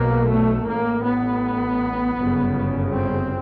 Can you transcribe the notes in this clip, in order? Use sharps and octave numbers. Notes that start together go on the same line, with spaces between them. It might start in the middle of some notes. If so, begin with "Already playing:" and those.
Already playing: B1 B2 A#3
A3
A1 A2 A#3
B3
G1 F#2 C#3
C4